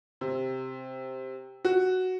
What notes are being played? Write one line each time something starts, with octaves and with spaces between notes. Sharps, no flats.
C3
F#4